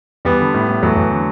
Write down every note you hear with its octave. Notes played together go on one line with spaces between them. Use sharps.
E2 G3 B3
D3
A2
A2
E2 F#3 A3
E2
D3